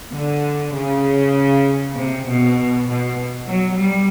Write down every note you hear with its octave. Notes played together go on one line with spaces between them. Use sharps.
D3
C#3
C3
B2
B2
F#3
G3